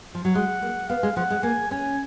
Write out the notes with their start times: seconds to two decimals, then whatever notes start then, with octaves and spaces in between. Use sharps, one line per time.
0.15 F3
0.25 F#3
0.35 G#3 F#5
0.62 A#3
0.89 B3 F5
1.03 G#3
1.16 F3 F#5
1.30 G#3
1.43 A#3 G#5
1.71 C#4 G#5